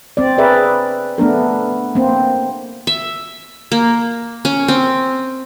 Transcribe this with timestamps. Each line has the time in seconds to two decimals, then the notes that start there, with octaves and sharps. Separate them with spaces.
0.17 C4 D5
0.38 G#4 A#4 B4 D5 E5
1.18 A3 B3 D4 A#4
1.95 A#3 C4
2.87 E5
3.72 A#3
4.45 C#4
4.68 C4